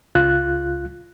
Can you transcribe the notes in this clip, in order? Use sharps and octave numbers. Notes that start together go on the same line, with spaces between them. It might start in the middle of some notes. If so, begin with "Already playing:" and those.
C#2 F4 F#6